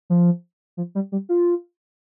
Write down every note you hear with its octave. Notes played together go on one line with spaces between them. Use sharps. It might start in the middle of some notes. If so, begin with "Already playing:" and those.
F3
F3
G3
G3
F4